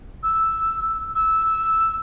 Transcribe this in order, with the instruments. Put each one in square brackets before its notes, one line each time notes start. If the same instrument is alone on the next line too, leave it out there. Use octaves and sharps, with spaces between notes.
[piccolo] E6
E6